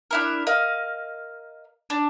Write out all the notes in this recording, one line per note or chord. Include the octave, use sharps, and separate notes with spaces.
D4 E4 A#4
A#4 D#5 F5
D4